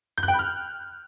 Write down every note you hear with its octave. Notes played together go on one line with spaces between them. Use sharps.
G6
F#6
G5
B5
F6